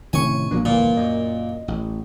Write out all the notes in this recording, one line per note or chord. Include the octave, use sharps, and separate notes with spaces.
A2 C3 D#3 C4 C#4 G#5 C#6
B1 A#2 F3 A#3 D4
G1 C#2 A#2 D3 E3 F3
F#2 D#5
A1